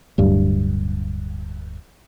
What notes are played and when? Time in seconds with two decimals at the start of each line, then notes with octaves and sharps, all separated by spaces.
0.18 D1 G2